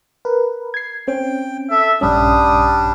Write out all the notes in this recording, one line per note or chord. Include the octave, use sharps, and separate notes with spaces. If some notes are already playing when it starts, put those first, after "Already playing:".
A#4 B4
G#6 C7
C4 C#4 G5
A4 E5
A#1 G2 G3 C#4 D4 D#6